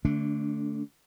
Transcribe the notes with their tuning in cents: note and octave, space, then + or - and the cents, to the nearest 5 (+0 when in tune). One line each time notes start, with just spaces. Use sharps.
D3 +0 A3 +0 D4 -35